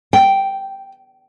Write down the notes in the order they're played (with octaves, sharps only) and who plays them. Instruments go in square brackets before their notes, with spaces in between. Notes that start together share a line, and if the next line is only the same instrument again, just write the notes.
[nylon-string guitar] G5